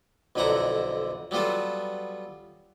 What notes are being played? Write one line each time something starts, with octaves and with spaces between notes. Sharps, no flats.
B1 F2 D3 E4 F#5 A#5
F#3 G3 B3 F4 A4